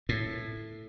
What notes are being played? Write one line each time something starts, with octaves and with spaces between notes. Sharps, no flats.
A2